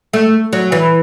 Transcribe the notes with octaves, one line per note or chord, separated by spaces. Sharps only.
A3
F#3
E3